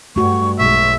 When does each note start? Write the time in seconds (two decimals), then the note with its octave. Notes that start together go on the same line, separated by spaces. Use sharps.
0.16 G2 A3 F#4 C#6
0.59 B1 G#3 E5 C#6